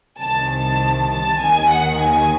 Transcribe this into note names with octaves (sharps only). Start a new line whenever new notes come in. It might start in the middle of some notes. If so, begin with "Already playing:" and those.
C2 C3 D#3 A5
A5
A5
D#2 D#3 G#5
F#5
G#5